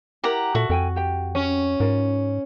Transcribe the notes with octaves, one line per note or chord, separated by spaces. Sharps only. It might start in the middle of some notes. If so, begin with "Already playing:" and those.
E4 G4 A#4 F#5 A#5
A#2 F#4 A4 E5 A5
F2 A4 G5 G#5
G4 G5
C#4
G#2 F4 A#4